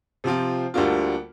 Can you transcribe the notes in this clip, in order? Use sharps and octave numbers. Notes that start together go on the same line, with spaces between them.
C3 F3 C4 F4
D2 D3 G3 A#3 F4